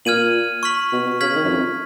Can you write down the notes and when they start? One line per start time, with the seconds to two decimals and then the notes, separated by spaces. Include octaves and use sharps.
0.05 A#2 F6 G#6 D#7 F#7
0.63 C#6 F6 B6 F#7
0.92 B2
1.06 B2
1.21 C#3 F6 G#6 B6 F#7
1.35 D#3
1.44 F#2
1.49 F2